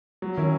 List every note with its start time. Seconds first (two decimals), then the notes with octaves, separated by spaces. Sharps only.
0.22 F#3
0.37 D#3 C#4 E4